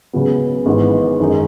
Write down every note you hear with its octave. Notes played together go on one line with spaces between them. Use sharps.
C#2 C#3 F#3 B3
G#1 G#2 E3 B3
F#2 D#3 G#3 D#4